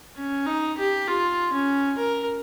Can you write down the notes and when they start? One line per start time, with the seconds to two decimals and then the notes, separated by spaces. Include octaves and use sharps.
0.17 C#4
0.46 D#4
0.77 G4
1.07 F4
1.52 C#4
1.97 A#4